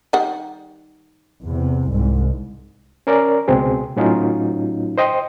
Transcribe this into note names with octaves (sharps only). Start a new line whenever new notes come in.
D#3 G3 F#5
E2 C3
C2 G#2
C#4 A#4 D5
C#2 B2 C4 G#4
A2 F#3 C#4 D#4 F4
C5 D#5 G5 C6